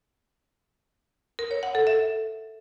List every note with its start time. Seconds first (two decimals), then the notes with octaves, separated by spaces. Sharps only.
1.39 A#4
1.51 C#5
1.63 F#5
1.75 A4
1.87 E5